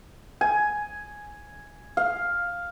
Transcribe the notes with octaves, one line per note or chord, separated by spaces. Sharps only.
G#5
F5